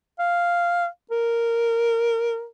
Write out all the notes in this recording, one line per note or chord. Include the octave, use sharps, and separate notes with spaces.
F5
A#4